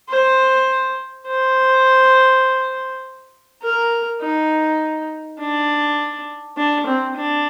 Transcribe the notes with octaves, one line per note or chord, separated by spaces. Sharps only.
C5
C5
A#4
D#4
D4
D4
C4
D4